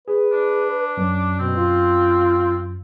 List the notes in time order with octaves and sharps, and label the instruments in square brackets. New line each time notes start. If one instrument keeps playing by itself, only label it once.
[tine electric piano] G#4 [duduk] B4
[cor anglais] D4
[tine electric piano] F#2
[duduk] B2 [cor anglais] C4
[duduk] F4